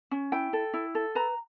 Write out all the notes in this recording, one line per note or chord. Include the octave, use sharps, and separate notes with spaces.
C#4
E4 G5
A4
E4
A4
B4 A#5